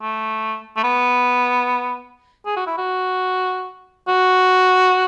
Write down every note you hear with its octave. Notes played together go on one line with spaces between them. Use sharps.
A3
A3
B3
G#4
F#4
E4
F#4
F#4